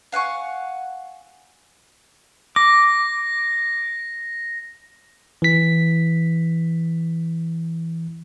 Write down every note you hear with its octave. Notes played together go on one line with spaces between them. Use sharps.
F5 F#5 G#5 C#6
D6 A#6
E3 B6